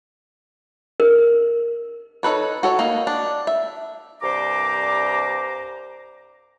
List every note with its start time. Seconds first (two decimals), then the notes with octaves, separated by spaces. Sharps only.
1.00 A#4
2.23 D#4 A4 B4 C#5
2.63 F#4 A4 C#5
2.79 A#3 D#4
3.07 D4
3.47 E5
4.22 C2 G2 C5 A#5 D6